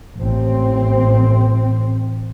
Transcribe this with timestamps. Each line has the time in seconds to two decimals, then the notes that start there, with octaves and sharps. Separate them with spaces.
0.19 A1 C4